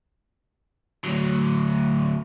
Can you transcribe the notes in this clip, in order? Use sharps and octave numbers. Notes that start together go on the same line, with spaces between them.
D2 F#3